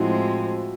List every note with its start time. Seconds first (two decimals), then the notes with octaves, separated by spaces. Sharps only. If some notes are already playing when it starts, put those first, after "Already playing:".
Already playing: A2 F3 G#3 C4 E4 F#4